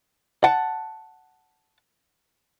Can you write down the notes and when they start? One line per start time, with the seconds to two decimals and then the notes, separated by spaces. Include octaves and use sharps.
0.44 F#5 A5